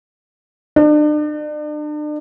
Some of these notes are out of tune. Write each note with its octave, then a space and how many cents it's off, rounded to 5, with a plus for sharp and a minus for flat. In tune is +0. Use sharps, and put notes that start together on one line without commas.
D4 +40